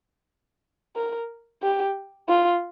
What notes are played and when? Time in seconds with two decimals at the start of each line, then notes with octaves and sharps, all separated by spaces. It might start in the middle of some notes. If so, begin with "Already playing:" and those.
0.96 A#4
1.63 G4
2.28 F4